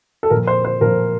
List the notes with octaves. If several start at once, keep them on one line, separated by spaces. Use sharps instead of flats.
A4
A#2 F3 A#4
C5
C5
A#2 F3 A#4